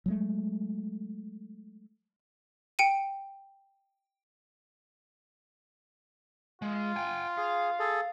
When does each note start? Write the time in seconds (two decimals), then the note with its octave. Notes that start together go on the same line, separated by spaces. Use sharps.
0.06 F#3 G#3 A3
2.79 G5 C#7 D#7
6.62 G#3 F4
6.96 G5 G#5
7.37 G#4 F5
7.79 G#4 A4